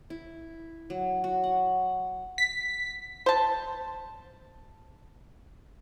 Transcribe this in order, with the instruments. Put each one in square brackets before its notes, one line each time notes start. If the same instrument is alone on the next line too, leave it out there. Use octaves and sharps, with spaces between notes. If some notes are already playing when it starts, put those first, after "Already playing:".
[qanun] E4
F#3
F#4
F#5
[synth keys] B6
[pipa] C5 A5